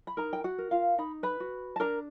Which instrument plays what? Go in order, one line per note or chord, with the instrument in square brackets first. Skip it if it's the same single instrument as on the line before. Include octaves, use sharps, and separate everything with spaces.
[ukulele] B5
D#4 A#4 A#5
G5
F#4 F#5
A#4
F4 F5
D#4 B5
B4 B5
F#4
A5
D4 A#4 A#5